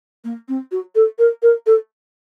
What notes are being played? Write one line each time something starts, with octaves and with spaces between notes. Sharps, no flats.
A#3
C4
F#4
A4
A#4
A#4
A4